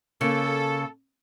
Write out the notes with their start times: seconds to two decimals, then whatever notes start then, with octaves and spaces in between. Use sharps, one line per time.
0.21 C#3 A#3 A4